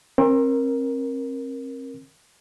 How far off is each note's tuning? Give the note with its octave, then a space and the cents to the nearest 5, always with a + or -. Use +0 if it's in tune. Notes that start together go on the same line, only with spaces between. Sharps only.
C4 +40 A#4 +10